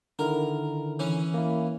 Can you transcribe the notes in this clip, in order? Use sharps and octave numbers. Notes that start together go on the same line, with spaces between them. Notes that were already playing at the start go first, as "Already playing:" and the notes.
D3 D#3 E4 A#4
E3 C#4
A#3 E4